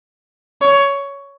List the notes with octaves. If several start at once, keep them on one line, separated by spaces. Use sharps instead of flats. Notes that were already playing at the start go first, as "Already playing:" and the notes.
C#5